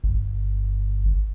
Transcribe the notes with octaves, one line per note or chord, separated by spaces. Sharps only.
G1